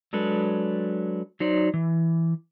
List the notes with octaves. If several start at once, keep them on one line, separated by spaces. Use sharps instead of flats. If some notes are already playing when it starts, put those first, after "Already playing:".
F#3 G#3 D4 A4 B4
F#3 D#4 C5 D5
E3